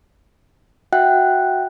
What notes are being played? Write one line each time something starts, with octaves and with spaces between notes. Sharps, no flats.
F#4 E5 F#5 G5 F#6